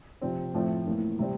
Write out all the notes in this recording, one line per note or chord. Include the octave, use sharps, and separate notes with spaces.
C3 F3 C4
A2 F3 A3 C4
A2 E3 A#3
C3 G3 C4